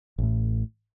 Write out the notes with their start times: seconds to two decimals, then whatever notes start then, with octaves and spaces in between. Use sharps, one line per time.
0.18 A1 A2